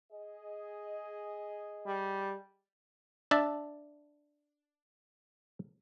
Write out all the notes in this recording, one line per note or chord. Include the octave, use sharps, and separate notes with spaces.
G#4 D#5
G3
D4 E5 A5